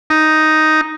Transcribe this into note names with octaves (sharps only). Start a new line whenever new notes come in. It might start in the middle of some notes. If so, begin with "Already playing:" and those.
D#4